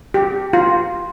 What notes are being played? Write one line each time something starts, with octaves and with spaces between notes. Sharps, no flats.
G4
F4